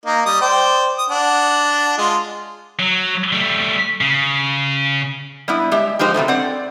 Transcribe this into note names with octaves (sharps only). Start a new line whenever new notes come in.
A#3 D#4
G3 D#6
C5 D5 G5
D#6
D4 F#5
G#3 F4 D#5
F#3
G3 A3
C#3
G3 B3 E4
G#3 G4 E5
F3 G#3 D#4 G4 C5
C3 F#3 G3 A3
C4 D5 F#5